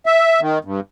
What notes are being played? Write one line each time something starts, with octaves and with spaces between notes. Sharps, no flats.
E5
D#3
G2